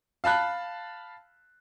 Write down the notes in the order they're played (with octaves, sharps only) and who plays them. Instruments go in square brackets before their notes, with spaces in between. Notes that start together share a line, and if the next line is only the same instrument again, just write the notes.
[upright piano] F5 A5 B5 F#6